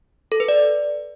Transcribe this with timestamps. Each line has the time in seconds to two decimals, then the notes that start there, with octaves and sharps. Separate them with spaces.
0.32 A4
0.40 B4
0.48 D5